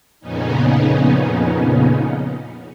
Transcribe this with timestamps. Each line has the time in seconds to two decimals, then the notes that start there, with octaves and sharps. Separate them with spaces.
0.20 F2 A#2 C#3 B3 C#4 D#4